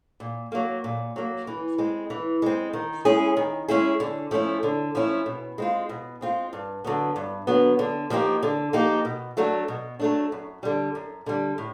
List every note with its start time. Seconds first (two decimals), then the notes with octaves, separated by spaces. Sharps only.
0.20 A#2
0.52 F#3 A#3
0.84 A#2
1.16 F#3 A#3
1.47 E3
1.78 G#3 C4
2.10 E3
2.42 G#3 C4
2.73 D#3
3.05 G#3 C#4 E4 G#4
3.37 D#3
3.68 G#3 C#4 E4 G#4
4.00 D3
4.31 F3 A3 C#4 E4
4.63 D3
4.95 F3 A3 C#4 E4
5.26 B2
5.58 G#3 C4 F4
5.89 B2
6.21 G#3 C4 F4
6.53 G2
6.84 D3 F#3 B3
7.16 G2
7.47 D3 F#3 B3
7.79 D3
8.10 F3 A#3 D#4 G4
8.43 D3
8.73 F3 A#3 D#4 G4
9.05 B2
9.37 F#3 A3 D4
9.68 B2
10.00 F#3 A3 D4
10.32 F#2
10.63 D3 G3
10.95 F#2
11.26 D3 G3
11.58 A2